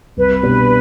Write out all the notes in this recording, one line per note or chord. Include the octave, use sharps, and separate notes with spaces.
C2 B4
B2 B3 D4 G4